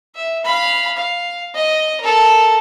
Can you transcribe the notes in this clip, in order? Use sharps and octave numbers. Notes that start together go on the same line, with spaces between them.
E5
F5 B5
F5
D#5
A4 A#4